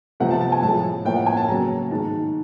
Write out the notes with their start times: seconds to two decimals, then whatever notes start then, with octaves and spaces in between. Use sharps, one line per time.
0.20 C3 F3 A3 F#5
0.30 A5
0.41 A5
0.52 G#5
0.62 A2 F3 G#3 A5
1.05 A2 F3 A#3 G5
1.16 F#5
1.26 G#5
1.37 A5
1.48 C#3 F#3 A#3 A#5
1.91 G#2 D#3 G#3 A5